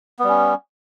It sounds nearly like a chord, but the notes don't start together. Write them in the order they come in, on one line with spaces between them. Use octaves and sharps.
B3 G3 C#4